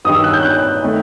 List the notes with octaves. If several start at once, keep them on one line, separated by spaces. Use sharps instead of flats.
G2 D#3 G3 D#6
E6
F#6
G6
F#6
D#3 A3